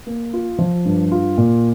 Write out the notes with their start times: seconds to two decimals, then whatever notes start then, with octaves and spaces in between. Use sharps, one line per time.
0.07 A#3
0.33 F4
0.59 F3
0.85 G2
1.12 F4
1.38 A#2